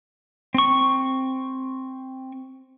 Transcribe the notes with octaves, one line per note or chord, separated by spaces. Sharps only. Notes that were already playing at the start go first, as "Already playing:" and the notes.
C4 C#6